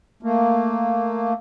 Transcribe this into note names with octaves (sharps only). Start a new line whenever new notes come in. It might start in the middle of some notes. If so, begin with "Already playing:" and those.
A3 A#3